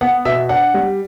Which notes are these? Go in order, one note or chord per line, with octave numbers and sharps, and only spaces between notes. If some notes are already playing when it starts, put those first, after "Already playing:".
B3 F#5
B2 E5
D4 F#5
G3